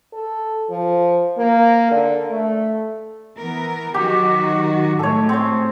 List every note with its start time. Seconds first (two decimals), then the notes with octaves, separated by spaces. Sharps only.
0.13 A4
0.70 F3
1.38 A#3
1.91 D3
2.31 A3
3.37 E3 B3 A#4
3.94 D#3 F#3 F#4 G4
4.99 A2 G#3 A3 A4 C#5
5.29 C4 C#5